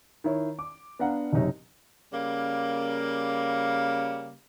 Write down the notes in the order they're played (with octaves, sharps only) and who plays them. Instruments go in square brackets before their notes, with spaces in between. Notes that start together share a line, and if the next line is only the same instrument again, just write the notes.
[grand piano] D#3 E4 C#5
D6
B3 D4 F5 F#5 A#5
F#1 F#2 C3 D#4 C#5
[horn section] C#3 G3 A#3